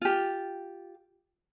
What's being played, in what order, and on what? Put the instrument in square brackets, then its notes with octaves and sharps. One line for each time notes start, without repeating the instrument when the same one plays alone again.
[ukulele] F4 G4